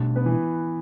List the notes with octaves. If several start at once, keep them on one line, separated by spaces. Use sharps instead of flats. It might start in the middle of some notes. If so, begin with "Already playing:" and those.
Already playing: B2 A3 D4
B3 B4
E3 E4